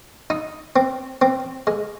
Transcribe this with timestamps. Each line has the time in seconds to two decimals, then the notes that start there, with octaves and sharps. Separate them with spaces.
0.30 D#4
0.76 C4
1.22 C4
1.67 G#3